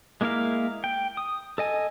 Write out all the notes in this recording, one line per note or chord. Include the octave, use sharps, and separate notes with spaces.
G#3 A#3 E4 A#4 F5
G5
D#6
A4 D#5 G#5